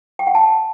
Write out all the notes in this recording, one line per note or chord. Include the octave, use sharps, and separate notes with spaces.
G5
F#5
A5